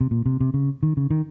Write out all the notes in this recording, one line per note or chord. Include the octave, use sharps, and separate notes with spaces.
C3
A#2
C3
C3
C#3
D#3
C#3
D#3